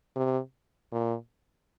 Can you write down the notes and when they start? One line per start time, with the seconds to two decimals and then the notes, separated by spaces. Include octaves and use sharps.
0.16 C3
0.92 A#2